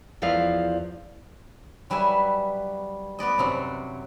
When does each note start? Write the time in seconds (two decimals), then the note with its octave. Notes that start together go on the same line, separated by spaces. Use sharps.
0.22 E2 F3 E4 D5 F5
1.90 F#3 G3 B4 E5 G#5
3.19 B3 B4 D5 D#5
3.38 F#2 C3 F#3